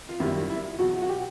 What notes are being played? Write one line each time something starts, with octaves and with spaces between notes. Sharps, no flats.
F4
F#2 D#3 G3 E4
E4
E2 B2 F#3 F#4
F#4
G4